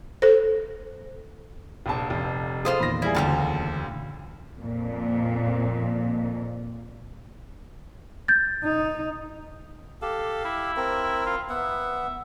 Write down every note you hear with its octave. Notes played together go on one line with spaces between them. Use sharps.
A4 C5
F1 A#1 A5
F1 F2
F4 G#4 A4 C5 D#5 F5
E2 A#2 D#3 B5 A#6
G3 E4 G#4
F#1 D2 F4 F#4 A5
F2 A#2
G6 A6
D#4
G4 A4 F5
E4
C4 A#4
F4
B3 E5 F#5